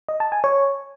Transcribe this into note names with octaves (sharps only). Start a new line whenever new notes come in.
D#5
A5
G#5
C#5